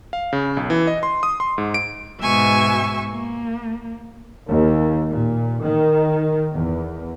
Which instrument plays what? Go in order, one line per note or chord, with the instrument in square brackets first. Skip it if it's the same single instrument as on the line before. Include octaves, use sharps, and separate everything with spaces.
[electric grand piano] F5
C#3
B1
E3
D#5
C6
D#6
C6
G#2
D7
[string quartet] G#2 B2 G#3 E5 G#5 C#6
A#3
[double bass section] D#2
A#2
D#3
E2